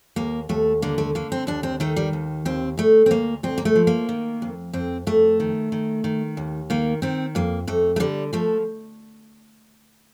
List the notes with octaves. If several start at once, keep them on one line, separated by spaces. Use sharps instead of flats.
D#2 A#3
D#2 A3
D3 A#3
A3
D3 A#3
C4
D#2 D4
C4
D#3 A3
G3
D#2
D#2 C4
D2 A3
C4
D2 A#3
D2 C4
A#3
A3
F3
A#3
D#3
F2
F2 C4
F2 A3
D#3
D#3
D#3
D#2
D#3 A#3
D#3 C4
F2 A#3
F2 A3
A3
D3 G3
F3 A3